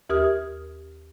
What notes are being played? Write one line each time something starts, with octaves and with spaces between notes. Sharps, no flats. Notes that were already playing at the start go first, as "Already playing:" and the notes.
D#2 G4 A#4 D#6 F6